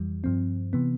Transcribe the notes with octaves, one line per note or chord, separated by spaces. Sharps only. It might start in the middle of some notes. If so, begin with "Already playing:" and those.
Already playing: F2 E3 G3
G2 F3 C4
C3 E3 B3